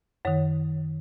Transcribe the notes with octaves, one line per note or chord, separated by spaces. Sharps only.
F#2 D#3 C#5